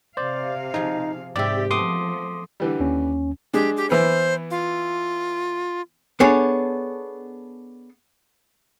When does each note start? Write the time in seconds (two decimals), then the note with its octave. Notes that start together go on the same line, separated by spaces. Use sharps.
0.17 C3 C5 D5 F5
0.74 F3 D#4 G#4
1.36 G#2 C3 C4 G4 D5 E5
1.71 F3 A3 B3 C6 D6 D#6
2.60 D3 E3 G3
2.80 D#2 C#4
3.54 G#3 D4 G4
3.77 G4
3.90 E3 B3 C5
4.50 F4
6.20 B3 D4 G#4 A4 C#5